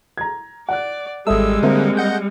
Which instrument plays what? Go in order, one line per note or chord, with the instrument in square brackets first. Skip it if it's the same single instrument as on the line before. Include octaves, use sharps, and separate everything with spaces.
[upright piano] A#5 G#6
[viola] D5 [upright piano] F#5 F#6
[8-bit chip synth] G#1 E6 [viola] G3 G#3 [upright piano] A4 E5 D#6
[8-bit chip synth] D3 [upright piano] A#3 C4 E5
[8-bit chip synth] D#5 F#5 G6